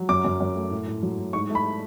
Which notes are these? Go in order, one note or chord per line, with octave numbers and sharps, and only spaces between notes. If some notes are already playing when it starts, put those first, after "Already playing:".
Already playing: F#3
F#2 D6
F#2
F#2
A3
A2
A2
F#3
A2
G#2 C#6
A3
B5